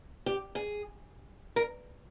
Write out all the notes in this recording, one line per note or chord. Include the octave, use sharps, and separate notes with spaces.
G4
G#4
A#4